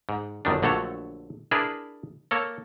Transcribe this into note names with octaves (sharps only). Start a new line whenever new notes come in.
G#2
G1 F#2 D#3 D4
A#1 D3 F#3 A3 A4 C#5
D4 E4 G#4 A#4 B4
A#3 A4 C#5